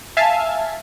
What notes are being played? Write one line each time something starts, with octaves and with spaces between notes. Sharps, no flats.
E5 F5 G#5 A5